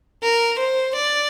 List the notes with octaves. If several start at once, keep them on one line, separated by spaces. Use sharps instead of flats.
A#4
C5
D5